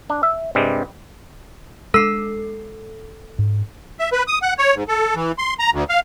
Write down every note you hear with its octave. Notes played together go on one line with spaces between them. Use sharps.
D4
E5
G2 C3 G3 G#3
G#3 D4 A4 E6 C7
G#2
E5
B4
D#6
F#5
C#5
G#2
A4
E3
C6
A#5
D2
F5